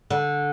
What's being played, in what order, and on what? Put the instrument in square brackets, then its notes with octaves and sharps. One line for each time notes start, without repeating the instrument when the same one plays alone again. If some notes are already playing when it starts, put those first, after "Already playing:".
[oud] D3